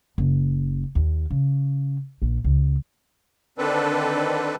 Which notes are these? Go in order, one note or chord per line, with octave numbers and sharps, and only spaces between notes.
F#1
D#2
C#3
A#1
C#2
D3 D#3 C4 D4 A4 B4